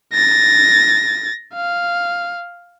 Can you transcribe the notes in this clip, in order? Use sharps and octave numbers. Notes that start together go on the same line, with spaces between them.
A6 A#6
F5